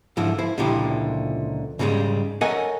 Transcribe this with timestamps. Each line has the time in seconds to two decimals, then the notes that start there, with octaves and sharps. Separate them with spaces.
0.17 G#2 D3 F3 E4
0.38 E4 C5
0.58 C#2 A#2 D3 F3 E4 G4
1.79 G#2 C#3 F3 G3 G#3
2.41 A4 A#4 C#5 D#5 F#5 G#5